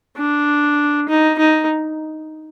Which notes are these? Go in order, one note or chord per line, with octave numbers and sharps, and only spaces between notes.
D4
D#4
D#4